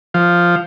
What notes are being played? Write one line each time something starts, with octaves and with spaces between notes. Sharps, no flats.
F3